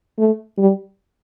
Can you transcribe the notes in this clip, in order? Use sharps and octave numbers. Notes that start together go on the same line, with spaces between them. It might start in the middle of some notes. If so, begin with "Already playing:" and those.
A3
G3